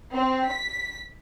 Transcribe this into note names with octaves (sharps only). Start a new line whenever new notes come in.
C4
B6